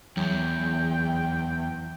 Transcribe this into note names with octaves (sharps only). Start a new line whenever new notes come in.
E2 F#3 G5